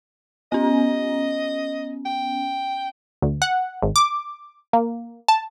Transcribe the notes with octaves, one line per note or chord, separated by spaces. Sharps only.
B3 C#4 D#5
G5
D2
F#5
G#1
D6
A#3
A5